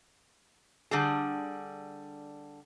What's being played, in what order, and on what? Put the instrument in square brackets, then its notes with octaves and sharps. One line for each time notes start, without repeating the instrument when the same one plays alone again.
[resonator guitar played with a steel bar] D3 G3 G#4